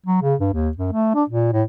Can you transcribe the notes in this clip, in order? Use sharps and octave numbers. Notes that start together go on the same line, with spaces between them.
F#3
C#3
G2
D#2
F#2
A3
D4
A#2
A2